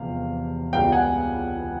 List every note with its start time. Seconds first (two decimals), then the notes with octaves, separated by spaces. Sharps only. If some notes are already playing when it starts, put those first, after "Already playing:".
Already playing: E1 E2 C3 F3 F5
0.73 C#2 B2 G3 F5 G5
0.92 F#5 G#5